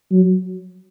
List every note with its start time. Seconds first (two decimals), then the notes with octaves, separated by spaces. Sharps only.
0.12 F#3